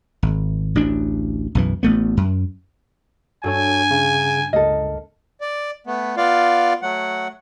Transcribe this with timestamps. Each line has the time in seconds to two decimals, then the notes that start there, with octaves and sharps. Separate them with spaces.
0.23 G#1
0.75 A1 D2 D4
1.55 B1 F#2 E3
1.83 A1 A3 B3
2.17 F#2
3.44 G2 D4 F#4 A4 C#5 G#5
3.91 C#3
4.53 C#2 A#3 A4 D#5
5.41 D5
5.87 A3 B3
6.17 B3 F4 D5 F5
6.82 F#3 A3 F#5